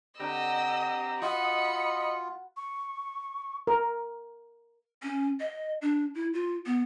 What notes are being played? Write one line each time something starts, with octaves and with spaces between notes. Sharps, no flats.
D3 C4 G4 D#5 A#5 E6
F4 F#4 D#5 B5 C#7
C#6
A#4
C#4
D#5
D4
E4
F4
B3